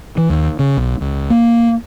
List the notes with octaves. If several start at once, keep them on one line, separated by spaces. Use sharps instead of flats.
E3
D#2
C#3
B1
C#2
A#3